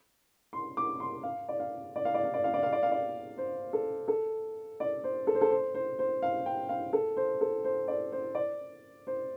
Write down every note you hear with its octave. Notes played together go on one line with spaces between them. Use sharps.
C6
D6
C6
F5
D5
F5
D5
F5
D5
F5
D5
F5
D5
F5
D5
F5
D5
C5
A4
A4
D5
C5
A4
C5
A4
C5
C5
C5
F5
G5
F5
A4
C5
A4
C5
D5
C5
D5
C5